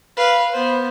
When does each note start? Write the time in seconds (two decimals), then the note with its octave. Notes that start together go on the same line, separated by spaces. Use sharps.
0.17 B4 F5
0.53 B3 C5